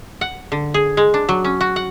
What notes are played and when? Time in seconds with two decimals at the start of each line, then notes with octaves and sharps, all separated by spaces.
0.21 F#5
0.52 D3
0.74 G#4
0.97 G#3
1.14 D4
1.29 F#3
1.44 C#4
1.61 F#4
1.76 F#5